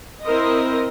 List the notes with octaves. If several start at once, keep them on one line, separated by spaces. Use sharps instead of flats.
C4 E4 A#4 C5 D#5